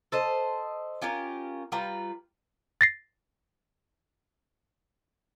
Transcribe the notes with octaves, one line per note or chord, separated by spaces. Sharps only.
A4 C5 D#5
C#4 F4 G4 A#4
G3 F4 B4 A#5
A6 A#6 C7